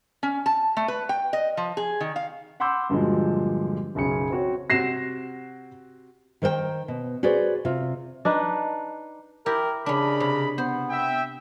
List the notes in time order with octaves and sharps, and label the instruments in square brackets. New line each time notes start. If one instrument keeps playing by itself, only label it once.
[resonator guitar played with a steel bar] C#4
A5
A3
B4
G5
D#5
F3
G#4
D#3
F5
[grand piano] F#5 B5 C6 D6 E6 G6
G2 A#2 D3 F3 F#3 G#3
B1 F#2 C#3 G#4 C#7
C4 F#4 C#5
[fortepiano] C3 C4 F#4 [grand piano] A#6 C7 E7
[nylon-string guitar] D#3 A#4 C5 D5 G5
B2
F#4 G#4 B4 C5 D5
C3 F4
[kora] D4 D#4 B4
[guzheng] E4 G4 [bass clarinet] A#4
[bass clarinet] C#3 [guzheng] C#4 D4 [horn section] A#4 D#5 B5
[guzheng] C3
[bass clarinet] B3 [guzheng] C5
[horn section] E5 G5